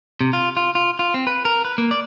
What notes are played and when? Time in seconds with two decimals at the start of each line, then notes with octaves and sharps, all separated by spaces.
0.21 C3
0.33 F4
0.57 F4
0.75 F4
0.99 F4
1.14 C4
1.27 B4
1.45 A#4
1.65 B4
1.78 A#3
1.91 D5